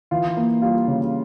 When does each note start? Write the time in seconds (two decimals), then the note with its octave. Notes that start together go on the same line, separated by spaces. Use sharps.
0.11 E3 F4
0.37 A#3
0.62 G3 F4
0.87 C#3